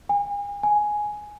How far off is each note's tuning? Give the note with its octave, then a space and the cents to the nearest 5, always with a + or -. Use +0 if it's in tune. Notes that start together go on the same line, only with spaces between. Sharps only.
G#5 -40
G#5 +5